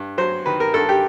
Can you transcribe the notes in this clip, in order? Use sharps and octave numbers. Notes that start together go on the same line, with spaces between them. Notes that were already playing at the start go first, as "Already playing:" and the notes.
Already playing: G2
F#3 C5
D#3 B4
A#4
G2 A4
G4